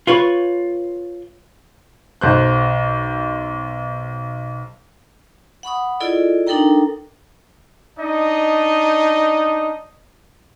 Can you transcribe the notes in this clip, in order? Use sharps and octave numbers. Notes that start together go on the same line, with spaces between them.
F4 B4 C#5
B1 C5 F#6
F#5 B5 C#6 D#6
E4 F4 G#4 A4 D5 D#5
D4 D#4 A4 A#4 G5 A#5
D4 D#4 D#5